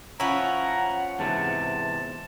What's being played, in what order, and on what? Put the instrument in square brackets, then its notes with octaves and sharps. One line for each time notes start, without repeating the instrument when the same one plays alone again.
[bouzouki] F3 C#4 [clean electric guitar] E4 [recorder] F#5 [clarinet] A#5
[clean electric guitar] E2 G#2 C3 [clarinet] A5